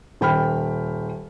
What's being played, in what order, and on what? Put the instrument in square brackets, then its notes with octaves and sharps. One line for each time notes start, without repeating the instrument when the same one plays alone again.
[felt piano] D#1 G5 B5 F6